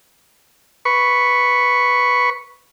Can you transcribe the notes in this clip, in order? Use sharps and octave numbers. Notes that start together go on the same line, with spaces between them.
B4 C#6